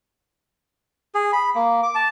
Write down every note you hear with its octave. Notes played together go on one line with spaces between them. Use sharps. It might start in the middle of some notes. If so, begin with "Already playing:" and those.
G#4
B5
A#3
D6
A5